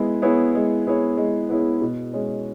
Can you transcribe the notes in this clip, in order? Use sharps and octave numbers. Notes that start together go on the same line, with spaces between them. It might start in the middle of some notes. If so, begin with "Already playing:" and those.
Already playing: G#3 B3 E4 G#4
B3 E4 G#4 C#5
G#3
B3 E4 G#4 C#5
G#3
B3 E4 G#4 C#5
B2
G#3 C#4